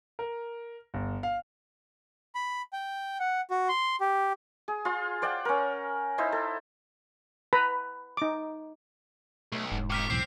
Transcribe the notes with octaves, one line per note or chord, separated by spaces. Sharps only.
A#4
G1
F5
B5
G5
F#5
F#4
C6
G4
G#4
F4 C6
C5 D5 F#5 G5
C#4 A#4
D#4 E4 C5
A4
B4 A#5 B5
D#4 D6
B1 A3
E1 G#2
F2 D#3 D6 F6 B6
E1 B1 A2 C4 C7